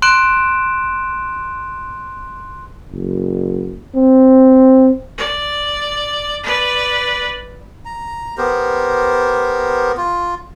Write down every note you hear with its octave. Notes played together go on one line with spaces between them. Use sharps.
C6 F#6 D7 E7
F#1
C4
D5
B4 D5
A#5
B3 G4 A#4 C5
F4